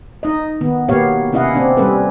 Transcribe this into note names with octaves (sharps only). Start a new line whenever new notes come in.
D#4 D#5
D#3 B3
B2 A#3 B3 G4 C#5 F5
C3 C#4 E4 D#5 F5 F#5
C4 D4
G3 C#4 A4 B4